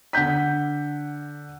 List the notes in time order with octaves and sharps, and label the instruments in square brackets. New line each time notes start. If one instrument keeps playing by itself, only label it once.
[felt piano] D3 F#5 G6 B6